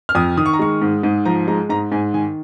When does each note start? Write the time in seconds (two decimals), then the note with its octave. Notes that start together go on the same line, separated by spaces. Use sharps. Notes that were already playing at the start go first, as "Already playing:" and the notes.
0.09 F6
0.15 F2 D#6
0.37 D#3 D#6
0.46 C#6
0.53 A#5
0.59 G#3 C#6
0.82 G#2
1.03 G#2
1.25 F3 A#5
1.47 G#3 A#5
1.70 G#2 A#5
1.92 G#2 G#5
2.14 D#3 G#5